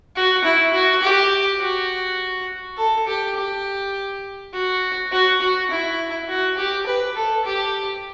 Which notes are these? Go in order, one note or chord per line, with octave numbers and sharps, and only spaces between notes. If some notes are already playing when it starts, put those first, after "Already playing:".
F#4
E4
F#4
G4
F#4
A4
G4
G4
F#4
F#4
F#4
E4
F#4
G4
B4
A4
G4